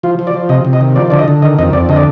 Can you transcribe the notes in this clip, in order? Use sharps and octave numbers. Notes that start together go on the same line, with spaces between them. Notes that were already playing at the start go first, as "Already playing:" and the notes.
F3 F4
F3
D5
F3
C3 D#5
C3
D#5
D#3
F3 D5
D3 D5
D#5
D3
D#3 D#5
F2 D#5
F2 D5
D3 D#5
D5